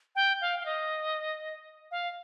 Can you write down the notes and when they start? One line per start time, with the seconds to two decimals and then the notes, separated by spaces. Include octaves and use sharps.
0.15 G5
0.41 F5
0.60 F5
0.66 D#5
1.91 F5